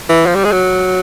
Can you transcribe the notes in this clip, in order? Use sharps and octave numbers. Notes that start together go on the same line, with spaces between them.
E3
F3
G3
G#3
F#3